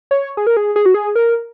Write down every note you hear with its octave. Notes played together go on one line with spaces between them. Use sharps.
C#5
G#4
A#4
G#4
G#4
F#4
G#4
A#4